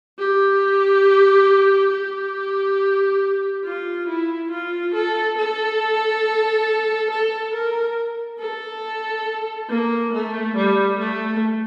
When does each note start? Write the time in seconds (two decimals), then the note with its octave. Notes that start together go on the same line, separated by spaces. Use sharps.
0.18 G4
1.92 G4
3.64 F4
4.08 E4
4.51 F4
4.94 A4
5.38 A4
7.10 A4
7.54 A#4
8.39 A4
9.69 A#3
10.13 A3
10.56 G3
10.99 A3